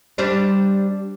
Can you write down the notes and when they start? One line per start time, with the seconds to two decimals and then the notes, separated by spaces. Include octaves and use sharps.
0.18 G3 D4 C5